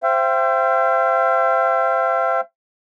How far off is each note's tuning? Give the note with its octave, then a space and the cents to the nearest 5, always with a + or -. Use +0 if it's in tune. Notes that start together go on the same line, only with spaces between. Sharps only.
C5 +0 E5 +45 G5 -15